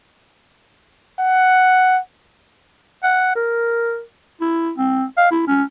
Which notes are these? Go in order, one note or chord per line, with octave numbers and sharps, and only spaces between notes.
F#5
F#5
A#4
E4
C4
F5
E4
C#4